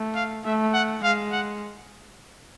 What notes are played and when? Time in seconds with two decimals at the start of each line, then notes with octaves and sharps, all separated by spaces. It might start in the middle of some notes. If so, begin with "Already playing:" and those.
Already playing: A3
0.15 F5
0.45 A3 E5
0.74 F#5
1.03 G#3 F5
1.32 F#5